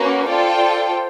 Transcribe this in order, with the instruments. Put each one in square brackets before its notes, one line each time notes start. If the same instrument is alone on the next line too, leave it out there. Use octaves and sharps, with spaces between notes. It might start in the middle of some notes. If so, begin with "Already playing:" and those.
Already playing: [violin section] A#3 C#4 F#4 [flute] B4
[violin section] F4 A4 D5 G5 [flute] C5
[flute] C5